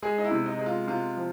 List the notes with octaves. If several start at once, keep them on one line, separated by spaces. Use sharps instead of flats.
G#3 G#4
D#4
E4
C3
D#4
G#3
F4
C3 F4
F3